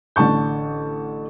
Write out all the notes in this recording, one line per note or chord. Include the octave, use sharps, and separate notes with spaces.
A1 D3 A5 C#6 G6